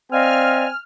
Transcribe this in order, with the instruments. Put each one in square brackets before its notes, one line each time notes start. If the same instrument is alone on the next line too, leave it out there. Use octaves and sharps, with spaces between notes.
[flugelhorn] C4 [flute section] D5 D#5 F5 [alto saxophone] G#5 [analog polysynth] F6